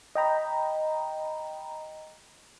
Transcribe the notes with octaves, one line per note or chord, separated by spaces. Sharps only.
D#5 G5 A#5 B5